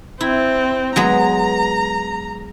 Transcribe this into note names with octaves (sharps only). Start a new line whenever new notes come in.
C4 E4
F#3 G#3 B3 A#5